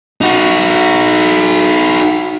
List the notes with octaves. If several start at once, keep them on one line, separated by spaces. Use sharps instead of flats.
D#4 F#4